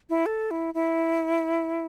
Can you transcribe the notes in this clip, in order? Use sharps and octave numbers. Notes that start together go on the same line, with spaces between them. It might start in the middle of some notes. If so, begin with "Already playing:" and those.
E4
A4
E4
E4